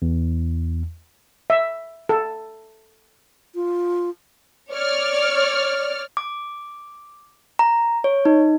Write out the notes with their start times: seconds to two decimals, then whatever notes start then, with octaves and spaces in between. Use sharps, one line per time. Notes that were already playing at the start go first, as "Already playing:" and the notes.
0.02 E2
1.50 E5
2.09 A4
3.55 F4
4.71 C#5 D5 F6
6.17 D6
7.59 A#5
8.04 C#5
8.25 D#4